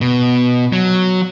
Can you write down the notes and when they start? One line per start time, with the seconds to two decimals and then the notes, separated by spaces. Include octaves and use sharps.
0.01 B2
0.73 F#3